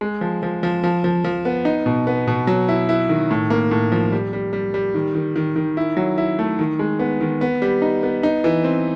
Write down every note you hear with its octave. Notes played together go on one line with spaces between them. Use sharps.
G#3
F3
F3
F3
F3
F3
F3
B3
D#4
B2
B3
B2
F#3
E4
E4
D#3
A2
A#3
A2
F3
G3
G3
G3
G3
D#3
D#3
D#3
D#3
E4
F#3
E4
A3
D#3
G#3
B3
D#3
B3
G3
D#4
B3
D#4
E3
C4